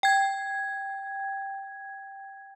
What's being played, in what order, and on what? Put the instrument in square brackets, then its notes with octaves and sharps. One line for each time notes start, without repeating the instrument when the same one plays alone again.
[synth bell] G5 G#6